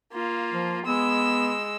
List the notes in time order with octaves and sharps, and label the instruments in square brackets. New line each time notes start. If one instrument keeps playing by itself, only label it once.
[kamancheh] A#3 F4
[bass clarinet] F3
[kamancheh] G#3 E6 [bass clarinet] B3